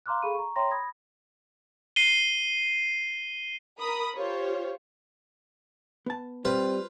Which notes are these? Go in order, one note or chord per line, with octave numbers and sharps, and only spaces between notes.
F5 A#5 C6 D6 F6 F#6
G#4 A4 F5 B5 C#6 D#7
A#5 C#6
C#5 E5 G5 A#5 C6 A#6
B5 D#6 G#6 A#6
C7 D#7 G7
A#4 B5 D#6
F4 G4 C5 C#5
B3 A5
G3 C4 F4 B4 C5